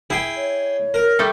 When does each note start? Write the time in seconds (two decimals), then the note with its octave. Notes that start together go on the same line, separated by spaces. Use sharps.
0.10 E4 G#4 G5
0.37 C#5
0.94 A#4
1.19 G3 A3 A4 D6